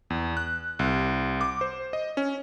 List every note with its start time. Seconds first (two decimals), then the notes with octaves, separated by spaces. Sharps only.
0.10 E2
0.37 F#6
0.79 C2
1.41 D6
1.61 C5
1.93 D#5
2.17 C#4